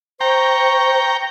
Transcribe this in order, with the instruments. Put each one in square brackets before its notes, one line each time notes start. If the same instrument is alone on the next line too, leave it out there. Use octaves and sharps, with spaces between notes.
[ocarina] C5 [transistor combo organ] G5 A#5 [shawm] C#6